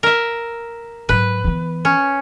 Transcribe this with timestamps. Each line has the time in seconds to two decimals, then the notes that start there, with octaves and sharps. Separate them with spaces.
0.03 A#4 E5
1.09 G#2 F#3 B4
1.44 E3 B3
1.85 C#4